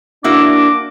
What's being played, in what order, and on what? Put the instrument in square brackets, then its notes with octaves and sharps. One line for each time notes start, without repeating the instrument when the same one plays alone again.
[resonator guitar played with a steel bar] A#3 E4 F#4 [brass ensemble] D4 [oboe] D6